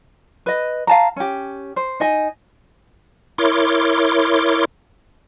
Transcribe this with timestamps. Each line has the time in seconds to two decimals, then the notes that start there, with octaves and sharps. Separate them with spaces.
0.46 B4 D#5
0.87 F5 A5 A#5
1.16 C#4 G4
1.76 C5
2.00 D#4 D#5 G#5
3.38 E4 A#4 C#5 C6 D6